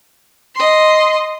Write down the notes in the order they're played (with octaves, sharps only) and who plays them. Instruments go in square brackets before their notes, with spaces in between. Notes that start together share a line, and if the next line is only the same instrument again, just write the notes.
[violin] D#5 C6